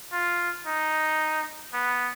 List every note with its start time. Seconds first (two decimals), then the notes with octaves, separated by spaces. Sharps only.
0.12 F4
0.67 D#4
1.74 B3